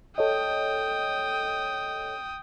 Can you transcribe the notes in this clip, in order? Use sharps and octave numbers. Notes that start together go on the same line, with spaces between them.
A4 C#5 D#5 G5 D#6